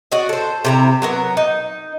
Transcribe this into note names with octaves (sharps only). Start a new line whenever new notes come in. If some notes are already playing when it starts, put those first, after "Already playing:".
F#4 D5 D#5
A4 C5
C3 E4 A#5
F#3 B3 A#4
D#4